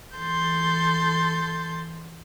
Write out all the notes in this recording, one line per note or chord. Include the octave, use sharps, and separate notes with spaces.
E3 A4 C6 G6 A6